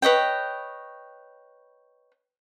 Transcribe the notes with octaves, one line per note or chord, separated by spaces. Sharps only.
B4 C#5 D#5 G5